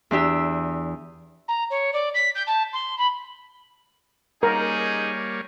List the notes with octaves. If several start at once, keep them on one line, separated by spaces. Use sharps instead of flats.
E2 D4 G4 E6
A#5
C#5
D5
B6
G6
A5
C6
B5
G3 A#3 C#4 D#4 G#4 A#4 C#5